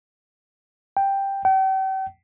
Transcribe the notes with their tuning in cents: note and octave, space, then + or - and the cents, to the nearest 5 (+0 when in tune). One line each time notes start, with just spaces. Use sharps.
G5 +5
G5 -40